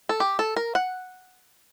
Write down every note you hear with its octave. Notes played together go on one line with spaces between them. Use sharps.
A4
G4
A4
A#4
F#5